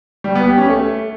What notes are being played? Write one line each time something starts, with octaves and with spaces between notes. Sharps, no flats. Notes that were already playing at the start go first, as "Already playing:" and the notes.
G3
B3
G4
C#4
A3